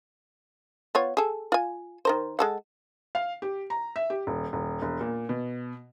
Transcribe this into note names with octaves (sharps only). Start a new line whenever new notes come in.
B3 F4 C#5
G#4 A4
F4 G#5
D#3 A#4 C5
G#3 A4 F#5
F5
G4
A#5
E5
G4
D#1
D#1
E1
A#2
B2